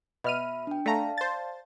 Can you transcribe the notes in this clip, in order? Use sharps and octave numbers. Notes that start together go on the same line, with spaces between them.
B2 E5 B5 F6 D#7
D4 G5
A3 D5 F5 A5 A#5
C5 A6